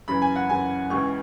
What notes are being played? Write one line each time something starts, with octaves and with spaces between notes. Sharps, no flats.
F#2 C#3 E3 B5
G#5
F#5
F#2 C#3 E3 G#5
C#2 C#3 E3 C#6